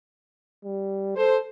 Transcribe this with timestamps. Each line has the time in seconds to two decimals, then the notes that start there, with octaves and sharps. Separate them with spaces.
0.65 G3
1.17 A4 C5